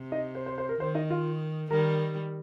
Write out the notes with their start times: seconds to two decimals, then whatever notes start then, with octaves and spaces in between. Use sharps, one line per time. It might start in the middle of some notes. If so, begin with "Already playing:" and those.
Already playing: C3
0.12 D#4 D#5
0.35 C5
0.46 C5
0.58 C5
0.69 A#4
0.80 D#3 C5
0.95 D#4 D#5
1.10 F4 F5
1.70 D#3 G3 A#4 A#5